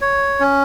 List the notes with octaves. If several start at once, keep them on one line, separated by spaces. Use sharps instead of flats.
C#5
C#4